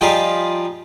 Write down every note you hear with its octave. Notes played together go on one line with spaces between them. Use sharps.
F3 G3 D#4 F4 G4 G#4